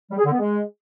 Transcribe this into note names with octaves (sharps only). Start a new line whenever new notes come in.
G3
G#4
D3
B3
G#3